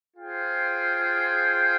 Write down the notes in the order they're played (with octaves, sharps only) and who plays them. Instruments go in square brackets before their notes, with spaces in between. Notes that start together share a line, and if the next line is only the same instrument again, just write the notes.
[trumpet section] F4 G#4 C5 G5